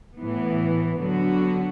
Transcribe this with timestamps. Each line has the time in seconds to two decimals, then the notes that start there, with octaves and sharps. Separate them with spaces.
0.17 A2 E3 B3
1.00 D3 F#3 B3 F#4